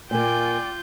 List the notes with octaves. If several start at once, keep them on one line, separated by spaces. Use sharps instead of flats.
A#2 A#3 F4 D5 G5 G#5 G6